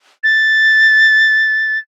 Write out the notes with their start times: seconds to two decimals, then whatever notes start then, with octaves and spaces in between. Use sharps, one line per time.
0.24 A6